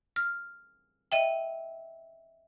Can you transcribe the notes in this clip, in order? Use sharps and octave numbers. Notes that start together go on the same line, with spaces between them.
F6
D#5 E5 G5